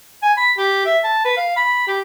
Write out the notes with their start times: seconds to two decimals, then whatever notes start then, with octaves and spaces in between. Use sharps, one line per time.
0.23 G#5
0.37 B5
0.58 G4
0.86 E5
1.04 A5
1.25 B4
1.37 F5
1.56 B5
1.88 G4